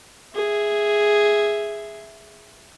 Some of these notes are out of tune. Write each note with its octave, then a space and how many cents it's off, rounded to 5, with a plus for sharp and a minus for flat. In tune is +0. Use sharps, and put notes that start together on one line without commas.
G#4 +0 E5 +0